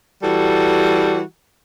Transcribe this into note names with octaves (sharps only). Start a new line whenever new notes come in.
E3 G3 F#4 A4